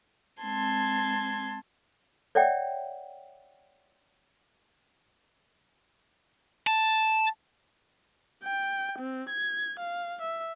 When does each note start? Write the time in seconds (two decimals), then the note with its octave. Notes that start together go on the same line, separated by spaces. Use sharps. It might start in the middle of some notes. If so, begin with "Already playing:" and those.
0.41 G#3 C4 A5 C6 G#6
2.35 C#5 D5 E5 F#5 G5
6.67 A5
8.44 G5
8.99 C4
9.29 G#6
9.79 F5
10.21 E5